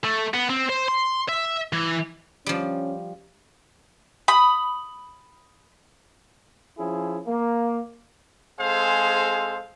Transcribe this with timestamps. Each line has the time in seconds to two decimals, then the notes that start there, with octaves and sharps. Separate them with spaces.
0.04 A3
0.34 B3
0.50 C4
0.69 C5
0.88 C6
1.29 E5
1.73 E3
2.46 F3 G3 C#4
4.28 B5 D#6
6.78 F3 C#4 E4 G#4
7.26 A#3
8.61 G#3 C4 G#4 A4 C5 F5